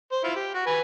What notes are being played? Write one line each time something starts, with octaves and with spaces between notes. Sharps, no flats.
C5
E4 F4
G4
F#4
B4 G#5